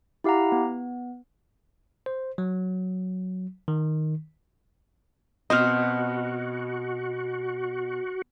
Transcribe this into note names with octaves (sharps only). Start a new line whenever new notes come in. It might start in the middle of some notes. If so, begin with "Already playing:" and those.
E4 G4 F5 F#5 A#5
B3
C5
F#3
D#3
B2 C4 F#4 C5 D#5 F6